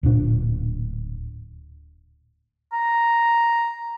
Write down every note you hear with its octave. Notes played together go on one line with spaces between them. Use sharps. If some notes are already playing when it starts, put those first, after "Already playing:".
D1 A#2 D4
A#5